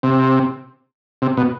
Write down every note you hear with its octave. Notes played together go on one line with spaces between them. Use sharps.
C3
C3
B2